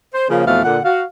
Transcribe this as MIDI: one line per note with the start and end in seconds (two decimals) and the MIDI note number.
0.13 0.24 72
0.29 0.43 49
0.29 0.43 53
0.29 0.43 58
0.45 0.64 41
0.45 0.64 47
0.45 0.64 52
0.45 0.64 57
0.45 0.64 59
0.45 0.64 77
0.64 0.79 46
0.64 0.79 50
0.64 0.79 78
0.84 1.03 66
0.84 1.03 77